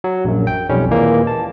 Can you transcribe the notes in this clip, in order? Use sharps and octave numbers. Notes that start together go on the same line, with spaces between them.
F#3
A#1 F#2
G5
B1 F2 G3 C#4
D#2 A#2 E3 G#3 A#3
A5